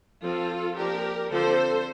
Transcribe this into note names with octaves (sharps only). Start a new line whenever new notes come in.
F3 C4 F4 A4
F3 A#3 D4 G4 A#4
D3 F3 C4 A4 C5